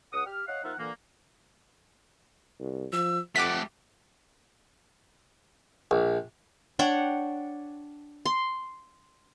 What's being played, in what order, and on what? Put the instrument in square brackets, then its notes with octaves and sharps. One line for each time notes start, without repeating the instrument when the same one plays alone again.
[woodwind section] C#2 F#5 D#6
G4 F6
C#5 D#5 F5 F#5
F3 A#3 D#4 F4 E5 F#5
A#2 D3 E3 A#3
[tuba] C2
[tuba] F3 [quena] E6
[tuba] F2 [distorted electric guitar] A3 G4 [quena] F#5 [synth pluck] D6 B6
[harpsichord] A#1
[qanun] D4 C#5 F#5 G5
C6